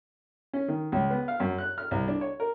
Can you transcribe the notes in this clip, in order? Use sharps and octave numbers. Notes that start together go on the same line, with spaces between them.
C#4
D#3
C#2
B3
F5
F#2
F#6
F6
C2
D4
C#5
A#4